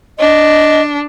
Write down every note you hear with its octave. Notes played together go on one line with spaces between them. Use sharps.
D4 D#5